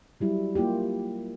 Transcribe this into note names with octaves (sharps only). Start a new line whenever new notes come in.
F#3 G3 E4
A#3 E4 F4 G4